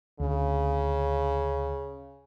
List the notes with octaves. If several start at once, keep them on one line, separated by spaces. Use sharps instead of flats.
D2 C#3